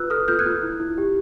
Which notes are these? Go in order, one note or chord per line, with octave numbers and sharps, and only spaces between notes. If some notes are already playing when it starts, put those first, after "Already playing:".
Already playing: F4 B4 E6 F#6
A4 D#6 F6
F4 F6 G6
F#6 G#6
F4
E4
E4
G4